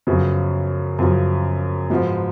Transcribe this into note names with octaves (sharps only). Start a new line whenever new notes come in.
F#2 C#3 F3 B3 F#4
F#2 C#3 F3 B3 F#4
G#2 F3 B3 F#4